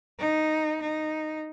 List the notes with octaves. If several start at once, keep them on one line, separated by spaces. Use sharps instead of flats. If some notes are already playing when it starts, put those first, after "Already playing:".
D#4
D#4